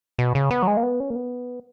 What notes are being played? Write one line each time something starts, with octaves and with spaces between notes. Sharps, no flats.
B2
C#3
B3
F#3
G#3
A#3
B3
C#4
A#3
B3